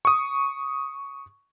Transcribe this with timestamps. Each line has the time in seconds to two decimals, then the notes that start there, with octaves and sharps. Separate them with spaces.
0.05 C#6 D#6